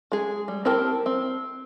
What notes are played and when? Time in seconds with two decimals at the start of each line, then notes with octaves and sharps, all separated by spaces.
0.12 G#3 G#4
0.48 G3
0.65 C4 E4 G4 A#4 A5
1.06 C4